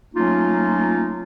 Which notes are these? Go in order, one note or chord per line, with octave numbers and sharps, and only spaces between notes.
F#3 A3 A#3 C#4 D#4 F4